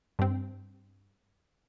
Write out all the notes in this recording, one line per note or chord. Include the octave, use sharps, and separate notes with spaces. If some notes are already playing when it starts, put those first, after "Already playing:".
G2 C4